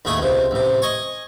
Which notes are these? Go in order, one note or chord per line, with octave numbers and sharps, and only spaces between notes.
D#2 A2 A3 G#4
C#2 C3
A1 C3
D#5 G#5 C#6